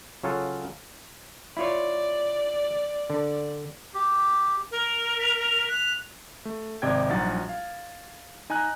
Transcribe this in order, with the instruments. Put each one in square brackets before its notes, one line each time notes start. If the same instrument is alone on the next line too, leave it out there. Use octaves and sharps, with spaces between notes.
[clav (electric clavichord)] C#3 F#3 F4 A4
[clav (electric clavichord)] E4 F4 C#5 [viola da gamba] D5
[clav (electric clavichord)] D3
[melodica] G4
[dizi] A#4
[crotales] B6 F7
[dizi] F#6
[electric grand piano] A3
G#1 C3 D5 D#5 G5 G#6
A#1 F#3 G3 D#4 F#5 A6
F5
D#4 G#5 A#5 F#6